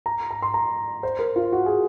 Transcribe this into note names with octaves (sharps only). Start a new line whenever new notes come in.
A#5
A#5
C6
A#5
C5
A#4
F4
F#4
G#4